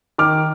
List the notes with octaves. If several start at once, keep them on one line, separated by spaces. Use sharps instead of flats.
D#3 D6 F6